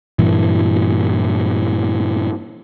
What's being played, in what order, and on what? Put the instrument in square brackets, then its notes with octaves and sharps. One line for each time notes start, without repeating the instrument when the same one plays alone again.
[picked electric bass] G2 A#2 E3